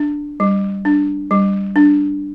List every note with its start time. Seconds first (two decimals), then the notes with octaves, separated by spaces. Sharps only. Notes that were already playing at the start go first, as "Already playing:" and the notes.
Already playing: D4
0.40 G3
0.85 D4
1.31 G3
1.76 D4